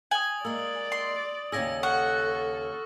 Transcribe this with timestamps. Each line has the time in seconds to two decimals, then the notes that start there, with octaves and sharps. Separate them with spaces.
0.11 G#5 D#6 F#7
0.45 G#3 A#3 D5 E6
0.92 C6
1.52 D#2 C#3 G#4 E6 A#6
1.83 A4 F#5 C#6 F6